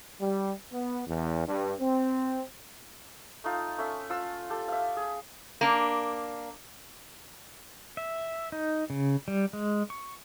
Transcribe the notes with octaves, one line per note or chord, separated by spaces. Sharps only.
G3
B3
E2
G2
C4
A3 D#4 F4
A3 C#4 E5
F4 E6
G4 A4
E5 F5
G#4
A#3 D4
E5
D#4
C#3
G3
G#3
C#6